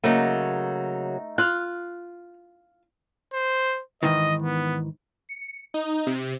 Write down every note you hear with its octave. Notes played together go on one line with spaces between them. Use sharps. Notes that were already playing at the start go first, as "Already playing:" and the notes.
C#3 F#3 A3 A#3 D#4
F4 F6 F#6
C5
G#2 D#3 E3 D#5
B3
C#7
D#4
C3